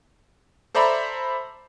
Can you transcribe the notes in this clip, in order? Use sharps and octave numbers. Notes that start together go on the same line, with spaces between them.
A4 C5 D5 E5 A#5 B5